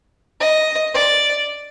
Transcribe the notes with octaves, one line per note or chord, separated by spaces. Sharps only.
D#5
D5